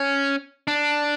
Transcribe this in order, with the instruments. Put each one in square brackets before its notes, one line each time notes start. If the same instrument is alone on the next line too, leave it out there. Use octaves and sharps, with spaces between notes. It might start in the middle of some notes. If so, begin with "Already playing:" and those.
Already playing: [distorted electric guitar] C#4
D4